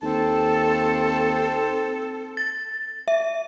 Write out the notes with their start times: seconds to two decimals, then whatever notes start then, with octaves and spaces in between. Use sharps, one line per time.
0.02 D#2 C4 A4 A5
2.37 A6
3.08 E5